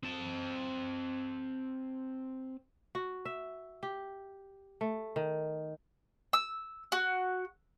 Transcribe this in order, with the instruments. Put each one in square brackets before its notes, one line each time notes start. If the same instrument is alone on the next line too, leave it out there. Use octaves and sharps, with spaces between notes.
[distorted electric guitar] C4 A5
[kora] F#4
E5
G4
A3
D#3
[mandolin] E6
F#4